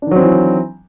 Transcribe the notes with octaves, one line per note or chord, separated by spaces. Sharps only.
D#3 E3 F#3 C4 D4